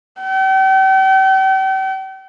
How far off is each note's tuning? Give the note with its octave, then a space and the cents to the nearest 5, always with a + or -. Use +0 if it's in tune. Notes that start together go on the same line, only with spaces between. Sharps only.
G5 -40